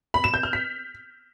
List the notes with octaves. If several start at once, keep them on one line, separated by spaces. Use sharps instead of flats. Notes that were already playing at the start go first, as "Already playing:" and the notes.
B5
E7
G6
F6
B6